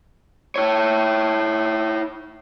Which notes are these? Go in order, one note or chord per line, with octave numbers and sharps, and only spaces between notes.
E4 C#5